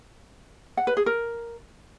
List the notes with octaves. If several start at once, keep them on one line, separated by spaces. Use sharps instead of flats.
F#5
B4
G#4
A#4